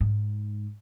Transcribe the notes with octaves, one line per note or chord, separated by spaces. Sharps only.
G#2